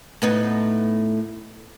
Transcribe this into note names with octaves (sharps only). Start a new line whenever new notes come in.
A2 B3 D#4